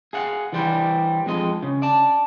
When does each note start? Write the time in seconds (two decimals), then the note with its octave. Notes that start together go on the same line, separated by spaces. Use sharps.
0.13 G#4 F5 F#5
0.53 E3 G3 C5 D5
1.26 F2 G#3 D#5 C6
1.63 C#3
1.82 D5 A5